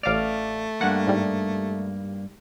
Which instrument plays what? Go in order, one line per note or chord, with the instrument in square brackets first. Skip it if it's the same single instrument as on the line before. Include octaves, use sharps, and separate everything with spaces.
[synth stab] A1 D6 F6 [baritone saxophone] A3 [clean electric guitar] D5 F5
[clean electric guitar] G2 A#3 [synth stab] F#5
[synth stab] G#2 G3